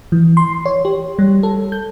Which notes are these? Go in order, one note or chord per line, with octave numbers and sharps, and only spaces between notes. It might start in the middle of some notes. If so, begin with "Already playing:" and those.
E3
C6
C#5
G4
G3
A4
G6